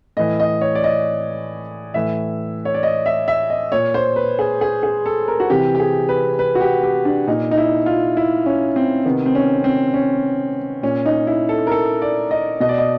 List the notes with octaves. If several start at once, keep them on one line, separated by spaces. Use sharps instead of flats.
A2 E3 D#5
D#5
C#5
D5
D#5
A2 E3 E5
C#5
D5
D#5
E5
E5
D#5
A#2 C#5
C5
B4
G#4
G#4
G#4
A4
A#4
F#4
C3 E3 G4
G4
G#4
B4
B4
F#4
G4
G4
D4
A#2 D#4
D#4
E4
F4
E4
C#4
C4
C3 D#3 B3
C4
C#4
C4
C#4
A#2 C#4
D#4
E4
A4
A#4
A4
D5
D#5
B2 D#5
D5
D#5